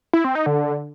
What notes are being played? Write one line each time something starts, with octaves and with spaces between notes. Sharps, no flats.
E4
C4
D#4
D3